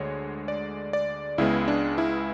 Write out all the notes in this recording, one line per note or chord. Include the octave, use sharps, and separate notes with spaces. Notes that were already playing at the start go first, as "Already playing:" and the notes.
Already playing: D2 D3 G#3 C#5
D5
D5
C#2 C#3 G#3 B3 E4
D4
E4